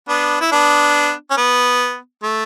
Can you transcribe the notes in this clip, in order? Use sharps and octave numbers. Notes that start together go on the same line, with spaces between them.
B3 D4
E4
B3 D4
C#4
B3
A3